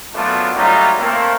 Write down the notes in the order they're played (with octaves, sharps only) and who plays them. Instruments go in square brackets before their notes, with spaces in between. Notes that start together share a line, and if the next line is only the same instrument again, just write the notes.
[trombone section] F#2 F#3 A3 B3 D4 F4
F#3 G3 A3 C#4 D#4 F4
A3 A#3 C4